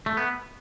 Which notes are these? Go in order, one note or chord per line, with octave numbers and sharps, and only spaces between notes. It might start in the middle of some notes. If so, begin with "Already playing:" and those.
A3
B3